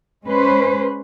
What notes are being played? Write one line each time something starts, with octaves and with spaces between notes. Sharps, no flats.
G#3 C#4 B4 C5